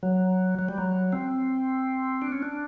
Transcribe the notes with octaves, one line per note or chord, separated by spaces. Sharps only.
F#3
F#3
G3
F#3
C4
D4
C#4
D4